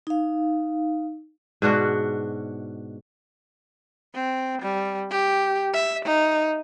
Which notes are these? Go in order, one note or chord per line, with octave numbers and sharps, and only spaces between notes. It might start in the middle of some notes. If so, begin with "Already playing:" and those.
D#4 F5
G#2 B2 D4 F#4
C4
G3
G4
E5
D#4